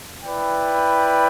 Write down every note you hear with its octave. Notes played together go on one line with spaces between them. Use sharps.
E4 B4 D5 G5